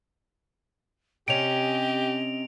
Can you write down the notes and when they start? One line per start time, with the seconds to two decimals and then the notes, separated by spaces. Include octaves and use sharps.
1.28 C3 C#4 G4 D#5 D7 F7